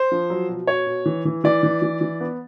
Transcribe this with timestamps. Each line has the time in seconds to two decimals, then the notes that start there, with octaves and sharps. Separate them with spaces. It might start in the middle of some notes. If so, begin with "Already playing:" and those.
Already playing: C5
0.12 F3
0.30 F#3
0.48 B2
0.67 B2 C#5
0.86 B2
1.06 E3
1.25 E3
1.44 E3 D5
1.63 E3
1.82 E3
2.01 E3
2.21 B3